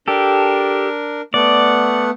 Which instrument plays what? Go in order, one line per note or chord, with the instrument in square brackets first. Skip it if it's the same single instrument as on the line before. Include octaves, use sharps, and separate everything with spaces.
[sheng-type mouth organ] D4 A#4 [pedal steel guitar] G4 A4
[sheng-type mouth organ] A3 B3 F#5 [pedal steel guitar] D5